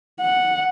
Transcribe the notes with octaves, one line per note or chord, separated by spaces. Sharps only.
F#5